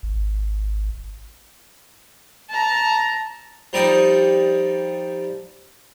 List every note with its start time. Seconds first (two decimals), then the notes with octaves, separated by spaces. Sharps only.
0.03 G#1
2.49 A5 A#5
3.73 F3 G3 D#4 D5 D#5